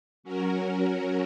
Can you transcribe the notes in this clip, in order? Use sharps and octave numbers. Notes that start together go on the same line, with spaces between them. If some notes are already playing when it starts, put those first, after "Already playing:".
F#3 C#4 F#4 A#4